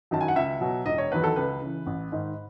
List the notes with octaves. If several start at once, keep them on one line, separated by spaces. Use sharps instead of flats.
F#2 D#3 F#3 A5
G#5
F#5
C#2 E5
B2 F#3
E1 D#5
C#5
E2 D#3 F#3 B4
A4
C#2 B4
C#3 E3
A1
G#2 D#3